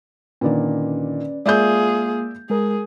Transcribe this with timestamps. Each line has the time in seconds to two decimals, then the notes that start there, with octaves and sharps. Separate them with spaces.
0.41 A#2 D3 D#3 C#4 B4 D5
1.46 G#3 A#3 F4 G#4 D5 E5 G6
2.50 G#3 G#4 A#4